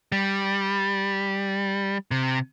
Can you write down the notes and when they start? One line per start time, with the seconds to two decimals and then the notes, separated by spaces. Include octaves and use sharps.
0.12 G3
2.11 C3